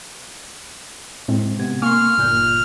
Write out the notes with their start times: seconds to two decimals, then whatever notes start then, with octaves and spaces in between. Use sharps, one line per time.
1.28 A2 G#3 C4
1.59 C3 B3 G#6
1.82 A#3 G#5 C6 C#6 F6
2.18 G1 A#2 G6